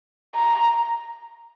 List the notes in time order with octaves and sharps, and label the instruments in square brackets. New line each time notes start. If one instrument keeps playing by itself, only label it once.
[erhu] A#5